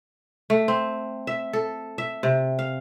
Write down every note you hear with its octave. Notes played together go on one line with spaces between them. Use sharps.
A3
C4
E5
A4
E5
C3
F5